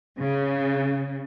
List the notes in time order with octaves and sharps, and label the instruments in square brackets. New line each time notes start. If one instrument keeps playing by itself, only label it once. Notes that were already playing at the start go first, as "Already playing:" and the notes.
[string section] C#3